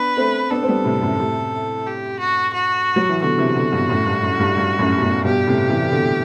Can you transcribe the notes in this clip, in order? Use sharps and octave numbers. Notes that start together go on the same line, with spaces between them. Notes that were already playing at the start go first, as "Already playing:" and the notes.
Already playing: B3 D4 B4
A3 C4
B3 D4 A4
C4
G3 B3
A2 C3
F#2 A2
A2 C3
G4
F#4
F#4
F#3
E3
B2 D3 F#4
C3 E3
B2 D3
G2 B2
F#2 A2
G2
F#2
G2
G2
F#2 A2
B2
F#2 A2
G2 B2 G4
A2 C3
C3 E3
B2 D3